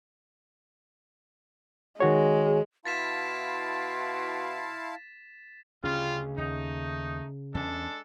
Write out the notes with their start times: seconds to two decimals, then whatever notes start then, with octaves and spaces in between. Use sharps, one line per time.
2.00 D#3 G#3 F#4 C#5
2.85 B2 E4 F5 A5 C6 A6 B6 E7
5.84 D2 C#3 G3 C#4 F4
6.38 D#2 A3 D#4
7.55 E2 G#3 C#4 D4 A4